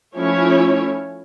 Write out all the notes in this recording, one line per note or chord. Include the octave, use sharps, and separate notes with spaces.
F3 A3 C#4 E4 C#5